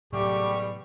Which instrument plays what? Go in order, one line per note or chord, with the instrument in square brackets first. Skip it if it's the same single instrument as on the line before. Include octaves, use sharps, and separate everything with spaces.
[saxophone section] E2 G3 [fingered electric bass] A2 C3 F#3 [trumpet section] A3 G4 [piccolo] C#6